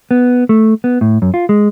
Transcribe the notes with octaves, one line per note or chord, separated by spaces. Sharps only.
B3
A3
B3
A2
F#2
F4
G#3